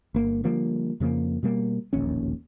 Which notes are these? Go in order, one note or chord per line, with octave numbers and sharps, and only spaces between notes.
G1 A#3
D3 F3 G3 A#3
F2 C#3 F3 A#3
B2 G3 A#3
E1 A#1 D#2 C#4